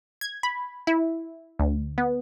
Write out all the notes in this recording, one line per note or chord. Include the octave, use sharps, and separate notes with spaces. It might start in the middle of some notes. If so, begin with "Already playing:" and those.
G#6
B5
E4
D2
B3